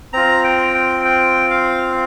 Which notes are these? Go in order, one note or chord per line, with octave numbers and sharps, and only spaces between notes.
C4 F4 A#5
G5
G5
G5
F5